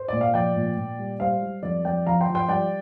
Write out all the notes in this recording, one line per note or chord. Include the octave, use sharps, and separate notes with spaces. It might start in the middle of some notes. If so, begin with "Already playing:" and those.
Already playing: C5
A#2 D5
F5
F3 D5 G5
A#2
A#2
G3
G3 C5 F5
G3
F2 D5
F2 D5 G5
F3 F5 A#5
G5 C6
F3
G5 C6
G3 D5 G5